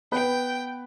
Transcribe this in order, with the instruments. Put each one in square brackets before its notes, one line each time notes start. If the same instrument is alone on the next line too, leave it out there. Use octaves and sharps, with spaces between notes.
[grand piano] B3 B4 [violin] G5